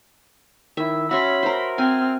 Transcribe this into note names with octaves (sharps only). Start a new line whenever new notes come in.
D#3 E4 E5
C#4 F#4 E5 B5 C6
A#4 C5
C4 G#5 F6